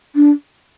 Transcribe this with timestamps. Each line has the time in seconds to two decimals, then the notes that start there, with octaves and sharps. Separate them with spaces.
0.15 D4